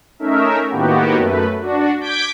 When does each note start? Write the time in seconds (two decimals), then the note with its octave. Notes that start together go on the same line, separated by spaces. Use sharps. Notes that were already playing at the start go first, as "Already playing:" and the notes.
0.19 A3 C#4 D#4 A#4 E5
0.70 A2 D#3 A#3 B3 F#4 G4
1.17 F#2 A3 B4
1.60 D4 F#4
2.01 D6 G6 G#6 B6 D7